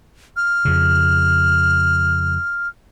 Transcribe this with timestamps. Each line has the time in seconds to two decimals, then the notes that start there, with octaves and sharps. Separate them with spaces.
0.37 F6
0.65 F2 C#3